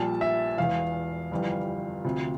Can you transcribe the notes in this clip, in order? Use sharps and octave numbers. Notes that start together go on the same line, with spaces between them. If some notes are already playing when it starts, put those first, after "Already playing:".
Already playing: A#1 A#2 G3 A5
E5
E1 E2 E3 F5
G1 F2 E3 G3
D2 C3 F3